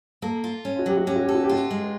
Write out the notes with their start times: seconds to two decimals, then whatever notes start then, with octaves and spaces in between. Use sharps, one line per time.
0.22 A#3 A4
0.44 F4
0.65 C#4
0.79 F#4
0.86 F#3 G4
0.97 F#4
1.07 C#4 G4
1.16 F#4
1.25 G4 A4
1.34 F#4
1.44 G4
1.49 F4 F#4
1.71 G#3